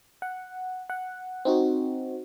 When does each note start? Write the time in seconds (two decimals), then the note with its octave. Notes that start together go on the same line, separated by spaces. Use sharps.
0.22 F#5
0.90 F#5
1.45 C4 D#4 F#4